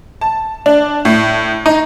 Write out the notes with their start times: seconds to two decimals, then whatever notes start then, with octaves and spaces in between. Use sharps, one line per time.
0.21 A5
0.66 D4
1.05 A2
1.66 D#4